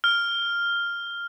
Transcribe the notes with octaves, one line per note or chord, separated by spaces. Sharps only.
F6